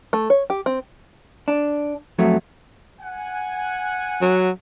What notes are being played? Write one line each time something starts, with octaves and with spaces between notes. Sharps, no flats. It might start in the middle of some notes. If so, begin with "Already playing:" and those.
A3
C#5
G4
C4
D4
F2 F#3 A3
F#5 G#5
F#3